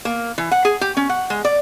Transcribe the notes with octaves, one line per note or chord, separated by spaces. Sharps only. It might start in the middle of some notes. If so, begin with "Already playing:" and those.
A#3
E3
F#5
G#4
G4
C#4
F#5
G#3
D5